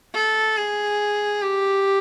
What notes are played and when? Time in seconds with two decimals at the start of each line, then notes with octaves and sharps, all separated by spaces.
0.14 A4
0.58 G#4
1.42 G4